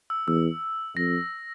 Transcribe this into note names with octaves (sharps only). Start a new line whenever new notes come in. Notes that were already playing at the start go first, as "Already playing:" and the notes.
E6
E2 E6
F2 A#6